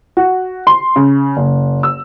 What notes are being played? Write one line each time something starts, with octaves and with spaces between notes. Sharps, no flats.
F#4
C6
C#3
F#1
E6